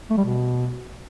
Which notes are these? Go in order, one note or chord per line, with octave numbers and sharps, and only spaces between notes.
A3
G3
B2